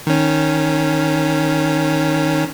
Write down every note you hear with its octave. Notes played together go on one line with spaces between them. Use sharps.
D#3 C#4